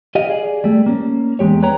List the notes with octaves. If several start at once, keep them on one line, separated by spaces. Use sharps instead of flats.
G4 D#5 F5
G#4 D5
G3 A3
A#3 C#4
E2 G#3 G4 C#5
B4 C#5 G5 A#5